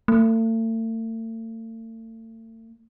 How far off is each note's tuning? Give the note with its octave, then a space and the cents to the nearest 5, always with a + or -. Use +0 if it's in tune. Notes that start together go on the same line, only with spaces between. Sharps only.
A3 +40